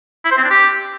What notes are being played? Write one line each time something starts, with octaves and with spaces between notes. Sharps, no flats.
E4
C5
C4
D4
G4